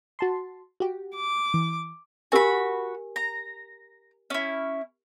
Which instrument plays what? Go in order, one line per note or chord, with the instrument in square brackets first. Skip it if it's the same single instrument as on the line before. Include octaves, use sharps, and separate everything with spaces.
[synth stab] F#4 A5 C6
F#4 G4
[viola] D6
[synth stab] E3
[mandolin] F#4 B5 [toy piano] G4 A#4 G#5
[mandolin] A#5
C#4 E4